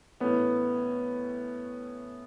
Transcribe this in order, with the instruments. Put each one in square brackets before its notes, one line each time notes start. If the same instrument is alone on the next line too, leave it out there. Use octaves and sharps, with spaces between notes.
[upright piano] A2 E3 A3 C#4 [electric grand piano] B3